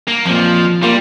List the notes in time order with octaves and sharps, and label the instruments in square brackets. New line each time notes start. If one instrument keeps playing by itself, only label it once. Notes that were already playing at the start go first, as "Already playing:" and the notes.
[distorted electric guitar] A#3
[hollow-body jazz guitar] F2 A#2 [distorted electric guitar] F3
[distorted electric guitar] G3 [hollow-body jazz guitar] A#3 F4